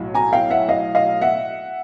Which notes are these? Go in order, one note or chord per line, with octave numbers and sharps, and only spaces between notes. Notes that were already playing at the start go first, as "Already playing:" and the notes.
Already playing: B1 A2 F#3
G#5 A#5
F5 G5
E5 F#5
D#5 F5
D#5 F5
E5 F#5